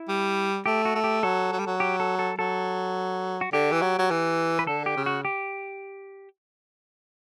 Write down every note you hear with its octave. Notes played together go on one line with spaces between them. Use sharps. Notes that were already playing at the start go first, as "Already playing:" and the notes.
Already playing: E4
G3
A3 G4
F#4
A3
G4
F#3 A4
F#3
G3
F#3
G4
A4
A4
F#3 A4
F#4
D3 G4
E3
F#3
F#3
E3
B4
D3 A4
G4
C#3
F#4
G4